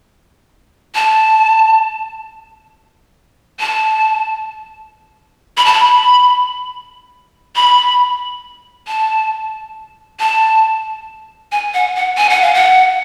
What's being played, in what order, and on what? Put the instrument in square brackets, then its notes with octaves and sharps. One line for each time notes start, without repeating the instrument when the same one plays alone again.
[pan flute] A5
A5
B5
A5
B5
B5
A5
A5
G#5
F#5
F#5
G#5
F#5
F5
F#5